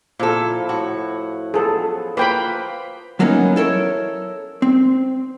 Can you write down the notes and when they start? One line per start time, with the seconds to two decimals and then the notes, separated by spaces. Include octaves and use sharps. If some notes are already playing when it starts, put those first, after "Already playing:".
0.19 A#2 F3 E4 A4
0.69 A2 F#4
1.54 F3 F#3 B3 G#4 A4
2.17 F3 A#3 B4 G5 B5
3.19 E3 F#3 A#3 B3 C#4 D#4
3.56 E4 A4 A#4 C#5
4.62 C4